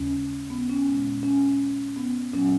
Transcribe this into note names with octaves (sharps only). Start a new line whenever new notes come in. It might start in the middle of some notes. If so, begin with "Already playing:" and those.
Already playing: D#2 C#3 G#3 C#4
B3
C#4
A#2 G#3
C#4
B3
A#2 F#3 C#4